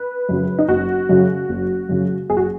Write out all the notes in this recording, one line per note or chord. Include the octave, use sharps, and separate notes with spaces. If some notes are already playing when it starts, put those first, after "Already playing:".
Already playing: B4
F#2 C#3 F#3
D#4
F#1 F#4
F#2 C#3 F#3
F#1
F#2 C#3 F#3
F#1 G#4
F#4